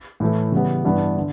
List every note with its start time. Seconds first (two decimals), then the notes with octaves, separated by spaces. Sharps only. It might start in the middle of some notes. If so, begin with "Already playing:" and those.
0.20 A2 E3 A3
0.52 C#3 E3 G3 B3
0.84 G2 E3 B3 D4
1.17 D3